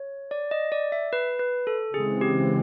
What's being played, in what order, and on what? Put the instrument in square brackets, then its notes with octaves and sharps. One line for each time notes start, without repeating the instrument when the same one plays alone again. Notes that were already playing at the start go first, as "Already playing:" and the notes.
Already playing: [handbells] C#5
D5
D#5
D5
E5
B4
B4
A4
[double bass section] C#3 E3 G#3 C4 [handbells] G#4
[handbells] G4